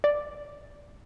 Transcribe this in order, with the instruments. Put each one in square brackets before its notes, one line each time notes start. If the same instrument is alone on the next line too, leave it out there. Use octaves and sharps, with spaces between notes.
[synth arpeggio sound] D5